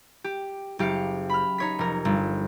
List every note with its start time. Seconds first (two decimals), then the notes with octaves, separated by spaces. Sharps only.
0.24 G4
0.79 F#1 G4 F5 C#7
1.29 B5 F6
1.58 D#4 C#5 B6
1.79 F1 A#4
2.05 G1